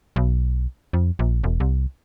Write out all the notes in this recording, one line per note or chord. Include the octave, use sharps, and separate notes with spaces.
B1
F2
A#1
E1
C2